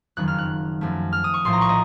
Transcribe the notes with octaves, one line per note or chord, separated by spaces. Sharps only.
F#1 F2 D#3 F#3 F#6
F6
F#6
F#2 F3 A3
F6
D#6
C#6
A#1 A2 F3 C6
A#5
C#6
D#5